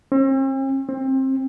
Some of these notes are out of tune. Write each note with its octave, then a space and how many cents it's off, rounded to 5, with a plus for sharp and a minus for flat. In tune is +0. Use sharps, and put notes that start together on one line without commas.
C4 +45
C4 +25